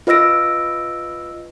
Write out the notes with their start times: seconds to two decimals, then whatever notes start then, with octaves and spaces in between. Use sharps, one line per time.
0.07 F4 B4 D#5 E6 A#6 D7